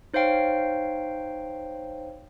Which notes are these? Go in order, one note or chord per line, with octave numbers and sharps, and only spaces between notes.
D#4 C5 C#5 F5 G5